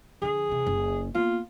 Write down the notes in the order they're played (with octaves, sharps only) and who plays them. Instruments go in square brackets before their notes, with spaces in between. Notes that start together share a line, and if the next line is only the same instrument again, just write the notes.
[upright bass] D3 F3 [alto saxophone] G#4
[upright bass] E2 C3
F#1
[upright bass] A#3 B3 [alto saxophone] F4